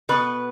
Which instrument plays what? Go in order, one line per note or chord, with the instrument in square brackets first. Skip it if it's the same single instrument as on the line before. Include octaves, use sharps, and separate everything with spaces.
[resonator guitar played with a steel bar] B2 B3 B4